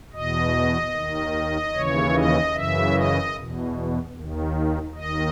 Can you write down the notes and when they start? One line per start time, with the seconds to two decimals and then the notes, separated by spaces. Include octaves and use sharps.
0.13 E2 B2 D#5
0.93 D#2 D#3
1.74 D#2 C#3 E3 C#5
2.14 D#5
2.54 F#2 C#3 E3 E5
2.94 D#5
3.35 E2 B2
4.14 D#2 D#3
4.95 D#2 D#3 D#5